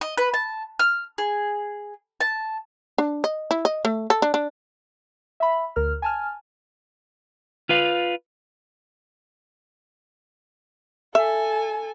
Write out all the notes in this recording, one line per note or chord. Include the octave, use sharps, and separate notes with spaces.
D#5
B4
A5
F6
G#4
A5
D4
D#5
E4
D#5
A3
A4
D4
D4
E5 B5
D2 A#4 F6
G#5 A5 F6
F4 B4 F5
A4 E5 G#5